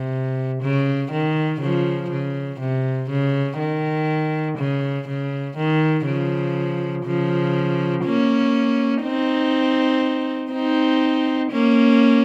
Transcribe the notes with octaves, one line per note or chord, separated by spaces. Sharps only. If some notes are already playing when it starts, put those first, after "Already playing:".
Already playing: C3
C#3
D#3
C#3 F3
C#3
C3
C#3
D#3
C#3
C#3
D#3
C#3 F3
C#3 F3
A#3 C#4
C4 D#4
C4 D#4
A#3 C#4